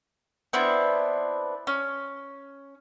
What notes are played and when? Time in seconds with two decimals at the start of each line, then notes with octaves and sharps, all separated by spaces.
0.53 B3 C4 D4 E4
1.67 C#4